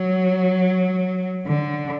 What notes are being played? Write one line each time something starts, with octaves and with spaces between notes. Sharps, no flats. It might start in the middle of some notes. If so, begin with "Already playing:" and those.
Already playing: F#3
D3